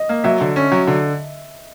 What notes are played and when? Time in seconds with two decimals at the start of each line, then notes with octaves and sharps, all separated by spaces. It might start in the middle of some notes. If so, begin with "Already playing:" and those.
Already playing: D#5
0.09 A#3
0.24 F#3 E5
0.41 D3
0.56 C#4
0.72 F#3
0.87 D3